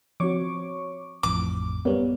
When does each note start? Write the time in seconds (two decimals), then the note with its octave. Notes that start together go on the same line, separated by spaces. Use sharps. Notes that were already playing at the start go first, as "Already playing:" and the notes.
0.20 F3 C4 F#4 C#5 C#6 D6
1.23 A1 F2 A2 D6
1.85 F#2 G3 B3 A#4 C#5